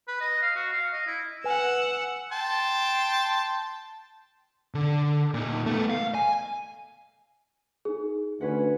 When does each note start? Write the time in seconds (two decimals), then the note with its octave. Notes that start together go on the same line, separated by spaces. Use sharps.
0.08 B4
0.21 D#5
0.42 F5
0.56 F#4
0.73 F5
0.93 D#5
1.07 E4
1.44 B4 F#5 G#5 E6
2.32 G5 A5 C6
4.75 D3
5.34 A#2 D#4
5.66 A3 B3
5.90 F5
6.15 G#5
7.85 D#4 G#4
8.41 D2 C#4 B4 F#5